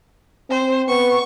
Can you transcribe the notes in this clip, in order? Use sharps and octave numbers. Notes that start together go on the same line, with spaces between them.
C4 C5
B3 C#6